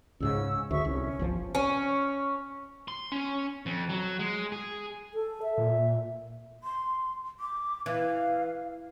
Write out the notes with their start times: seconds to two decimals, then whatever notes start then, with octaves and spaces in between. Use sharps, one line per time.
0.20 C#2 G#2 C#3 C#4 E6
0.71 D2 G#4 E5 C#6
0.85 C2 C#4
1.19 G1 C2 F3
1.55 C#4
2.88 C6
3.12 C#4
3.66 F2
3.89 F#3
4.19 G#3
4.52 G#4
5.14 A4
5.42 E5
5.58 A#2
6.64 C6
7.40 D6
7.86 E3 F5